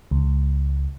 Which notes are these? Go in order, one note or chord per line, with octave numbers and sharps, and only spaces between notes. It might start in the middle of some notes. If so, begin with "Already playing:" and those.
C#2